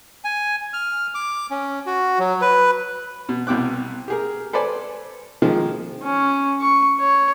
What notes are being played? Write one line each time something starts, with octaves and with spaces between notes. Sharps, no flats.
G#5
F6
D6
C#4
F#4
F#3
B4
B2
C2 B2 G5 D6 F#6
G4 G#4 A#4
A4 B4 C5 D5 G#5
D#3 F3 G#3 A#3
C#4
C#6
C#5